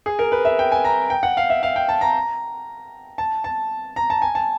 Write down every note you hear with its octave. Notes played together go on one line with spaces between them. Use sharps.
G#4
A#4
B4
E5
G5
G#5
A#5
G5
F#5
F5
E5
F5
G5
A5
A#5
A5
A5
A#5
A5
G#5
A5